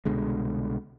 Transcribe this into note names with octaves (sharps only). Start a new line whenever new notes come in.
C2 B2 D3 G#3